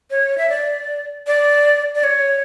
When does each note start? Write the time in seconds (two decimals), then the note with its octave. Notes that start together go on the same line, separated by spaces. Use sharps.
0.11 C#5
0.38 E5
0.50 D5
1.27 D5
1.95 D5
2.04 C#5